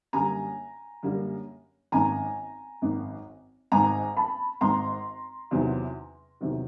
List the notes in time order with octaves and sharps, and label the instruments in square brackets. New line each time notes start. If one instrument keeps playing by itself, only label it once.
[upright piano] F#2 D3 G3 A#3 G#5 A#5
F#2 D3 G3 A#3
G#1 F#2 D#3 G#5 A#5
G#1 F#2 D#3
G#1 G#2 D#3 G#5 A#5
A5 B5
G#1 G#2 D#3 A#5 C6
E2 C3 D#3 F#3
E2 C3 D#3 F#3